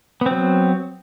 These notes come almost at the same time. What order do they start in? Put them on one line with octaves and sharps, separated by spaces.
B3 C4 F#3